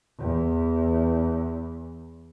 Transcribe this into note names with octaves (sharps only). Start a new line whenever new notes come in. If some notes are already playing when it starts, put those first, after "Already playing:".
E2 E3